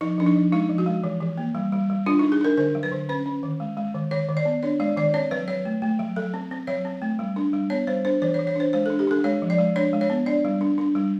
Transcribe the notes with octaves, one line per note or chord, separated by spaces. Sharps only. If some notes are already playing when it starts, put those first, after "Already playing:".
F3 D#4
F3 D4
D#4
F3
G#3 D#4
F3
F#4
G#3
E3
E3
A#3
G3
G3
G3
D4 F4
D#4
D4
G#4
D4 A#4
D3 A#4
F#3
B4
D3
C#4 B4
C#4
D#3
G#3
G#3
D#3
D#3 C#5
D#3
D5
B3
D4 C#5
G#3 D5
D#3 D5
C4 C#5
F#3 B4
F#3 C#5
A3
A3
F#3
F#3 A4
C4
C4
F#3 C#5
C4
A3
G3
D4
G3
B3 C#5
G3 C5
D4 C5
E3 C5
C#5
E3
C#5
D4 C5
G#3 C5
A4
D4
G4
D4 A4
G#3 C#5
F3
D5
G#3
D4 C#5
G#3
C#5
B3
D4 D5
G3
D4
D4
G3